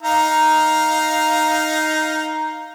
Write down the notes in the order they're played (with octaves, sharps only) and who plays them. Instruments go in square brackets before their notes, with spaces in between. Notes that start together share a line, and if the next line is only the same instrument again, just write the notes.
[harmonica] D#4 F5 A#5